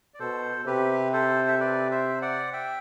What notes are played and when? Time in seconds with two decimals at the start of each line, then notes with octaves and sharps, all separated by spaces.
0.14 D5
0.20 B2 A4 C5
0.66 C3 G4 B4
1.13 A4 C5
1.48 E5
1.60 B4 D5
1.91 C5 E5
2.22 D5 F#5
2.53 E5 G5